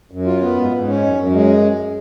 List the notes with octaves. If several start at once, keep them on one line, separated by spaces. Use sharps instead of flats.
F#2
F4
B3
G#2
G#2
C#4
F#2
F#2
G#3